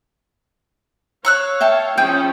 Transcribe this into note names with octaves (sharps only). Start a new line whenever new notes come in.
C#5 F5 C#6 E6 F#6
E5 G5 A5
F3 C#4 E4 G#4 G5